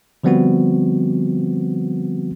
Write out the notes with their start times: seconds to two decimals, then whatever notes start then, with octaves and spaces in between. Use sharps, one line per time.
0.24 D3 F3 G3 B3 C4 F#4